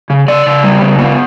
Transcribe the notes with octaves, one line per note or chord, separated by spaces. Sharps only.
C#3
C#3 D5
C#3
G3
C#3
B3